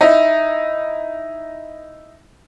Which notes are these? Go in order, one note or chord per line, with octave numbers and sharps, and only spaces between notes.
D#4 E4